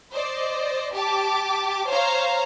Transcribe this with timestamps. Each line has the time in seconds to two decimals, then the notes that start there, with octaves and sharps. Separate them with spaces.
0.12 C5 D5 D#5
0.94 G4 A5 D6
1.88 C5 C#5 F5 A#5